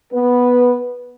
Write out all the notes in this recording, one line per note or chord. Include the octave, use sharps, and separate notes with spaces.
B3 B4